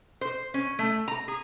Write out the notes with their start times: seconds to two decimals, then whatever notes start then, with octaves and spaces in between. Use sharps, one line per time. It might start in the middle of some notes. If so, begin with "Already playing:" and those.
0.21 C5
0.54 C#4
0.79 A3
1.08 A#5
1.28 G#4